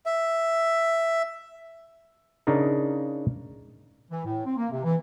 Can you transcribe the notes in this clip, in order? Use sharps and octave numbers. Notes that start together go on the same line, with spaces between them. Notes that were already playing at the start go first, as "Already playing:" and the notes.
E5
C#3 D4 D#4 A#4
E3
A2
C4
A#3
C3
E3